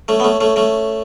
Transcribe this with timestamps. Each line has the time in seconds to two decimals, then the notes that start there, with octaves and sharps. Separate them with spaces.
0.08 A3 C#4
0.20 B3
0.24 A3 C#4
0.41 A3 C#4
0.56 A3 C#4